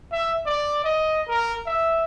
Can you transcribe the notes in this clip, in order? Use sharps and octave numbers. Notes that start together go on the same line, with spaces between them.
E5
D5
D#5
A#4
E5